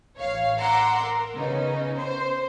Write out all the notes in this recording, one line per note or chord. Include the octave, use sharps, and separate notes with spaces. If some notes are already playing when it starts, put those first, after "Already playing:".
A1 C#5 F5
F#5 A#5 C6 D6 E6
A#4
C#3 B3 C#4 D#4
C5